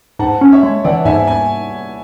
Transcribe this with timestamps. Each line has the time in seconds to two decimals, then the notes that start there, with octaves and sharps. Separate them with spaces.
0.19 G#2 F#5 A5
0.41 C#4
0.52 C#5 E5
0.63 G#3
0.84 E3 D5 F#5
1.05 G#2 E5 G#5
1.27 G#5